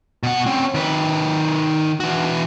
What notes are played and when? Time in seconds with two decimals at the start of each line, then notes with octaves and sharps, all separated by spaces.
0.23 B2 F#5
0.46 C4 C#4
0.74 D#3 B4
2.00 E3 F#4